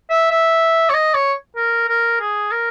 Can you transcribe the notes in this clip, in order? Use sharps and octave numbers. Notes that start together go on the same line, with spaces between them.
E5
E5
C#5
D#5
C#5
A#4
A#4
G#4
A#4